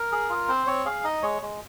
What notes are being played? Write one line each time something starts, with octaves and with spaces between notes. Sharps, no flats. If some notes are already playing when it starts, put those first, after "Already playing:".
Already playing: A#4
G#4
F4
C4 C5
C4 C#5
G#4 F5
D#4 D#5
G#3 C#5
G#3